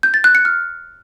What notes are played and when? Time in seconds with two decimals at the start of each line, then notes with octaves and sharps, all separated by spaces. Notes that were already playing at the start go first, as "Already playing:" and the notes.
0.03 G6
0.14 A6
0.24 F#6
0.35 C#7
0.45 F6